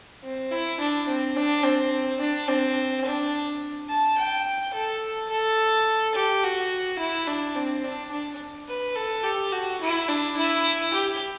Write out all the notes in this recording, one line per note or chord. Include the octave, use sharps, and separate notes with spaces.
C4
E4
D4
C4
D4
C4
D4
C4
D4
A5
G5
A4
A4
G4
F#4
E4
D4
C4
D4
D4
B4
A4
G4
F#4
E4
D4
E4
G4